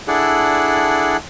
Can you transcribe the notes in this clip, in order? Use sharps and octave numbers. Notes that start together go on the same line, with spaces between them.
D4 E4 G#4 A4 D5 F#5